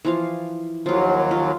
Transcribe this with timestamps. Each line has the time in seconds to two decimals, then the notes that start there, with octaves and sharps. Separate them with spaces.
0.05 E3 F3 F5
0.86 D#2 F3 F#3 F4
1.31 F4